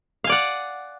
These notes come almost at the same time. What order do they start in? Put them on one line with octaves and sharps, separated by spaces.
F5 G#5 D5 F#5